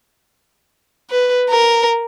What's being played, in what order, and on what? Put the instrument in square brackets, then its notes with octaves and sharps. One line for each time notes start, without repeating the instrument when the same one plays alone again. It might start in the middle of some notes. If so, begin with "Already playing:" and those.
[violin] B4
A#4